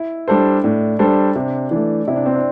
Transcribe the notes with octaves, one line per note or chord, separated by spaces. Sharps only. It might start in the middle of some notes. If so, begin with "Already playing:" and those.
Already playing: E4
G3 D4 A4 C5
A2 D4
G3 D4 A4 C5
C3 D4
E3 A3 D4
C3 E4
D4
C4
D4